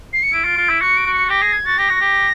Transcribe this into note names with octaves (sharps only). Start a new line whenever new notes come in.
C7
C#7
E4 D7
F4
F4
E4
F#4 C#7
D7
F#4
C#7
G4 A#6
G#4
G#6
F#4 A6
G4 A#6
F#4
G4